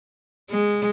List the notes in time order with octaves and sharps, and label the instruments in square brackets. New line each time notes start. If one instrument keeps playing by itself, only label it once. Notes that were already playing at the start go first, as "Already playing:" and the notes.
[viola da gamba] G#3